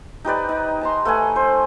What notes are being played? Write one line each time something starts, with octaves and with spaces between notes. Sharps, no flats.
D#4 G4 B4 D5
D#4
A5 A#5 C6
A3 B4 F#5 G#5
C5